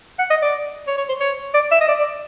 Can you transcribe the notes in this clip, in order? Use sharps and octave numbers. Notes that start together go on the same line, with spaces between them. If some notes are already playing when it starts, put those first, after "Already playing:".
F#5
D#5
D5
C#5
C#5
C5
C#5
D5
E5
D#5
D5
D5